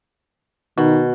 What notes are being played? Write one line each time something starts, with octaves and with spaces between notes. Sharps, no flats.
B2 D#3